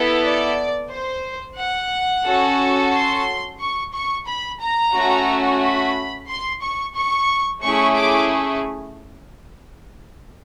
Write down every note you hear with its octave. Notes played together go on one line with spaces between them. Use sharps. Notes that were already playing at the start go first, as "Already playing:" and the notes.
Already playing: B3 E4 A4
D5
C5
F#5
C#4 F#4 A4
C6
C#6
C#6
B5
A#5
A3 C#4 F#4
B5
C6
C#6
C#6
A3 C#4 E4 G#4 C#6
D6